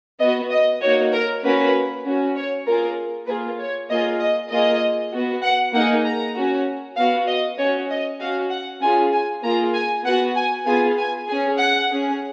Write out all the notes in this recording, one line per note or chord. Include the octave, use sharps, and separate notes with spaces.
B3 F#4 D#5
D#5
A#3 D#4 F#4 C#5
A#4
A#3 C#4 F#4 B4
C#4 F#4
C#5
A#3 F4 G#4 A#4
A#3 F4 G#4 B4
C#5
A#3 F4 G#4 D#5
D#5
A#3 F4 G#4 D#5
B3 F#4
F#5
A#3 D#4 G#4 F#5
A#5
C#4 F#4
B3 F#4 F5
D#5
C#4 F#4 C#5
D#5
C#4 F#4 F5
F#5
C#4 F4 G#4 G#5
G#5
A#3 F4 G#4 A#5
G#5
B3 F#4 F#5
G#5
B3 F4 G#4 G#5
G#5
C#4 G#4 G#5
F#5
C#4 G#4